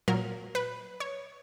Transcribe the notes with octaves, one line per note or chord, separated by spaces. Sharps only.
A#2 F#3 A#4
B4
C#5